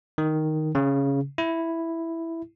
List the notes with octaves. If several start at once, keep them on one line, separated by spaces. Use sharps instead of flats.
D#3
C#3
E4